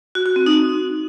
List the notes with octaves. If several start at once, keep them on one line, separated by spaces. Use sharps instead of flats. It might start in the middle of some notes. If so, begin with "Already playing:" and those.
F#4
F#4
C4
D#4